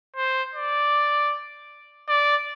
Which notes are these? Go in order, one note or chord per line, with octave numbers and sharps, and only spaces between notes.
C5
D5
D5